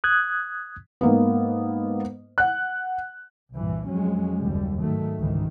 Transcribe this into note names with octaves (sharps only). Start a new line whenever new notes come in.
D#6 F#6 G#6
G#2 A#3 B3
F#5 F#6
C2 G2 A#2 E3
F2 F#3 G#3 C#4
F#1 D#2 G3
G#2 D#3 F#3 A3
G1 C#2 G#2 D#3 E3